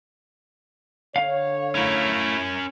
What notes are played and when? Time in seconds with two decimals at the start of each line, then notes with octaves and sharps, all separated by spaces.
1.16 D3 C#5 F5
1.75 A3 C#4 E4 A#4